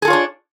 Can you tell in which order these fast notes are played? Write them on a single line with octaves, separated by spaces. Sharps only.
G#4 A4 F4 C#5 D4